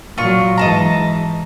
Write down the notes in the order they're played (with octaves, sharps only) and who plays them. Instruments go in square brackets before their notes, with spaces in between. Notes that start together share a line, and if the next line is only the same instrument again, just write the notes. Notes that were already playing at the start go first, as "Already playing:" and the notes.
[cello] A#2 F#3 [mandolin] F4 C#6
[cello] G#2 E3 [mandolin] D#5 A5 A#5